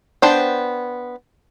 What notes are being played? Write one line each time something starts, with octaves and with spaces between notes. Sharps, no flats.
B3 D4 C5 G5